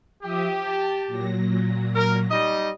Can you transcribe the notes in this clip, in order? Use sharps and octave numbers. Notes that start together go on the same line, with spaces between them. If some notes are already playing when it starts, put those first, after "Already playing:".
F3 G4 E5 D#6
A5
A#2 F#3 A#6
A#4
G3 D#4 D#5